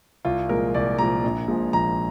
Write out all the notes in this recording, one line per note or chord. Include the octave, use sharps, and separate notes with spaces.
C2 F4
A#2 F3 G#3 A#4
C2 D5
A#2 F3 G#3 A#5
A#1
A#2 F3 G#3
A#1 A#5